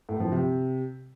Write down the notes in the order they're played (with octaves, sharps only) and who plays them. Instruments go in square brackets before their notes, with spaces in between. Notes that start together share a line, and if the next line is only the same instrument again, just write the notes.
[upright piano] A2
F3
C3